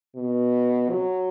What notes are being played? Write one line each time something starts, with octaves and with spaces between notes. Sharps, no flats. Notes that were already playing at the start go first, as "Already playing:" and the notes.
B2
F#3